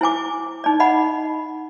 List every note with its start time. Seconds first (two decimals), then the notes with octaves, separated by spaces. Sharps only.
0.01 E4 C5 G#5 D6
0.64 D#4 D5
0.80 D#5 F#5 B5